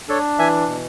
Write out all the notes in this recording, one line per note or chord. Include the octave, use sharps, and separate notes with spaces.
D4 A4 C#5
E3 E5 G#5
B2